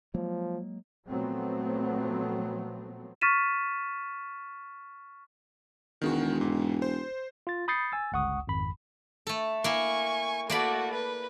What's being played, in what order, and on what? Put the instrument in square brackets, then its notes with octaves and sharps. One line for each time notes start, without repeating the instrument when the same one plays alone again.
[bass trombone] F3 [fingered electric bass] F#3 G#3 A#3
[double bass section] A#2 F3 F#3 A3 B3 C4
[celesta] C#6 F6 A6 B6 D#7 E7
[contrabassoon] E1 [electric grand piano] D#3 G#3 F#4
[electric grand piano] G#2
C5
[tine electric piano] F4 A6
B5 D#6 G6 A6 C7 C#7
G#5 E6 A6
G1 C#2 F#5 C#6 D#6
G#1 F2 B5
[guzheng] A3 A4
[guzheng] A#3 E4 [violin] G#5 C#6
[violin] A3 F#4 [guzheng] A#3 D5 B5
[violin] B4